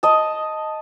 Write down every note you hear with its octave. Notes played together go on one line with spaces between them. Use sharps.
D#5 A5